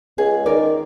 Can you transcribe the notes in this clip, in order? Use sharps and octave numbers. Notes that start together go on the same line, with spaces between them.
C#2 G#4
D#3 A#4 D5